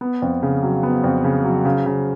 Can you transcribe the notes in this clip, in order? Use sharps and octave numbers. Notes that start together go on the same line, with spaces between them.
B3
F2
C#3
F#3
B3
F2
C#3
F#3
C#3
C#3